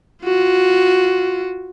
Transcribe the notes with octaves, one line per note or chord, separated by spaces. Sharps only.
F4 F#4